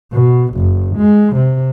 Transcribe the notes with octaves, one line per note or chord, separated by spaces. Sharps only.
B2
F#1
G#3
C3